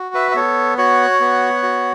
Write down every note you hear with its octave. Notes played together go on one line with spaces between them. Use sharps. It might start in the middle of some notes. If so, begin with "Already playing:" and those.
Already playing: F#4
B4 E5
E5
B3 A4 C#5
F#4 C#5 F#5
B3
F#4